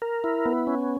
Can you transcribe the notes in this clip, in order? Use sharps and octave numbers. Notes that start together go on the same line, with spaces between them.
A#4
E4
B3
C#4